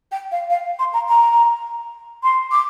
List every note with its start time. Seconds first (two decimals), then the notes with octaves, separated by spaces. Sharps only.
0.11 G5
0.31 F5
0.50 F5
0.79 C6
0.93 A#5
1.08 A#5
2.23 C6
2.51 D6